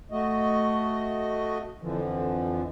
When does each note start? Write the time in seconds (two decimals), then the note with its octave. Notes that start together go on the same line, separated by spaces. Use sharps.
0.11 A3 F#4 D#5
1.82 F2 D3 E3 F3